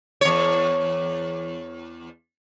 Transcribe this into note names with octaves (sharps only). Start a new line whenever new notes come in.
E2 C#5